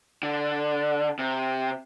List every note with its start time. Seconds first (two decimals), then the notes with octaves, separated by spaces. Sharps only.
0.23 D3
1.19 C3